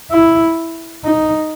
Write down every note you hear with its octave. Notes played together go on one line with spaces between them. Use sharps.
E4
D#4